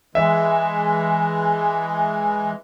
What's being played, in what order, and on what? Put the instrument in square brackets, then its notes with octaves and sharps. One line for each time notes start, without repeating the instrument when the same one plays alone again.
[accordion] E3 G#3 [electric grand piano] E5